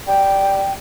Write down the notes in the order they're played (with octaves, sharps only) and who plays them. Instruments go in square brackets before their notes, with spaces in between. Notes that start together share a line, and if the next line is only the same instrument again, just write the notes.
[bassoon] G3 [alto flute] G5